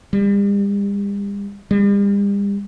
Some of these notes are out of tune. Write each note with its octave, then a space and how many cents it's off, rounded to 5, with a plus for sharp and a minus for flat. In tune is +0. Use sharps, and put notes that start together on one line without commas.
G3 +40
G3 +40